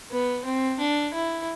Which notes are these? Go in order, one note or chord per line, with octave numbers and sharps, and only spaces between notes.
B3
C4
D4
E4